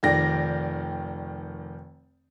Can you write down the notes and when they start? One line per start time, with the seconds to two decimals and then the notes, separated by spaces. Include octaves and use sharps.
0.03 F1 D#3 D5 G5 A#6